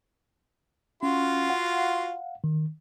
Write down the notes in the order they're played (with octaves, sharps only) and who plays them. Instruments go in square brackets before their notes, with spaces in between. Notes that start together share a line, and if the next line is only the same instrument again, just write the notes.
[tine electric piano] C#4 [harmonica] F4 F#4 C6
[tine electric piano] F5 F#5
D#3